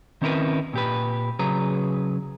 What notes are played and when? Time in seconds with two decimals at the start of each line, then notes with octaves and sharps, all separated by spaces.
0.22 D#3 C4 C#4 E4 A#4 B4
0.73 A#2 G4 B4
1.39 C#3 F#3 G#4 B4 A#5